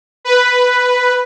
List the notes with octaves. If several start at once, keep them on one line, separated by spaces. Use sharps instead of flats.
B4